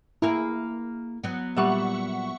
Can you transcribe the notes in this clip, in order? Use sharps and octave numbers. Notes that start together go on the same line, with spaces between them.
A#3 E4 G#4 A#4
F#3 B3
A#2 G3 E5 F#5 C#6